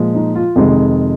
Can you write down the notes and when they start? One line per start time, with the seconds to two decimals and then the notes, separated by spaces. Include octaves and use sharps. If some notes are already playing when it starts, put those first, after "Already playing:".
Already playing: A#2 F3 G#3
0.14 D#4
0.35 F4
0.56 F2 C3 D#3 G#3